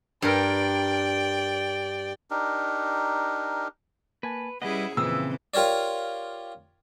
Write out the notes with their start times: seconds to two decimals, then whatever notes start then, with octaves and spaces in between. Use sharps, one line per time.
0.22 G2 A#4 D5 G5
2.30 D4 D#4 G4 A#4
4.23 A#3 B4 G#5 A5
4.62 G3 C#4 E4 G#4 B4 D#5 F#5
4.97 F2 A#2 C#3 E3 C4 D#6 E6
5.54 F4 G4 A#4 C#5 D5